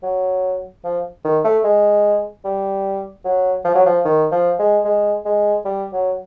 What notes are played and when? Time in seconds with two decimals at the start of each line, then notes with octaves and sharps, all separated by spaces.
0.03 F#3
0.85 F3
1.24 D#3
1.44 A3
1.64 G#3
2.45 G3
3.25 F#3
3.65 F3
3.75 F#3
3.86 F3
4.05 D#3
4.32 F3
4.59 G#3
4.85 G#3
5.26 G#3
5.65 G3
5.93 F#3